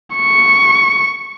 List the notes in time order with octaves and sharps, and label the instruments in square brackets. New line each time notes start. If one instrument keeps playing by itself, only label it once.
[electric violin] C#6